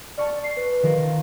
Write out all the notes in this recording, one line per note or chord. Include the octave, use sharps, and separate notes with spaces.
D5 A5 C#6 F6
C7
B4
D#3 F3 A#4